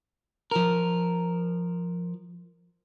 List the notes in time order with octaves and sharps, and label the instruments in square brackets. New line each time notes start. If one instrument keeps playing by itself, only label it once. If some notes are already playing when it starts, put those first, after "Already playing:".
[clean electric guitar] F3 A#4